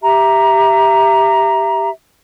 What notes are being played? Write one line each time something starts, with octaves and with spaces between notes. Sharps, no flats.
G4 E5 A#5